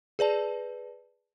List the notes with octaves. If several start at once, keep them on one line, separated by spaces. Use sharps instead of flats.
G#4 B4 D5 A5